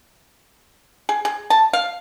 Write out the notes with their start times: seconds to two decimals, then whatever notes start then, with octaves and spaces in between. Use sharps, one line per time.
1.09 G#4
1.25 G#4
1.50 A5
1.73 F5